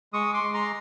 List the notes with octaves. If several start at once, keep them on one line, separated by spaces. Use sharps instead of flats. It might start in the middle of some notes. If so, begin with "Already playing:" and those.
G#3 C#6 D#6
C6 D6
G#3
A#5 C6